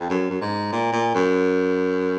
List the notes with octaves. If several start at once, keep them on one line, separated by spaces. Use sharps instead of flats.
F2
F#2
F#2
G#2
A#2
A#2
F#2